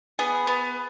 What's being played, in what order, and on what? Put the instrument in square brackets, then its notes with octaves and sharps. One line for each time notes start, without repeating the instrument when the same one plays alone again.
[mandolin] B3 [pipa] G#4
[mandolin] B3